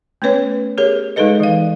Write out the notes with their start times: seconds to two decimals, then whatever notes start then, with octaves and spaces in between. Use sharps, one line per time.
0.22 A3 B3 C#4 B4 C#5
0.78 G4 G#4 A#4 C#5
1.16 G#3 D#4 G#4 A4 B4 D#5
1.40 E3 F5